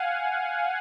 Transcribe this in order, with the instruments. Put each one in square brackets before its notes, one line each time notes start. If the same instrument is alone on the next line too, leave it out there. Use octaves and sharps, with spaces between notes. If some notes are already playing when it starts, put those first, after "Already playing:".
Already playing: [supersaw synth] F5 F#5 G#5